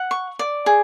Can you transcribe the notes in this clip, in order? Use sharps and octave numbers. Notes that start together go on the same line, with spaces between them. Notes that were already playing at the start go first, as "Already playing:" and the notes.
Already playing: F#5
C#6
D5
G#4